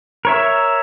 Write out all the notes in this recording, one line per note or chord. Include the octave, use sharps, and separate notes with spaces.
A#4 C#5 E5